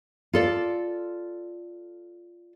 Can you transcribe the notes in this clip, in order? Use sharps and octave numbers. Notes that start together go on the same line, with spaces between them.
F4 A4 D5